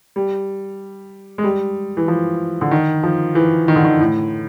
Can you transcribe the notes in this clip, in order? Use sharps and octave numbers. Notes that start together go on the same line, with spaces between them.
G3
G#3
G3
E3
F3
D3
D#3
F3
E3
D#3
D3
D#3
A2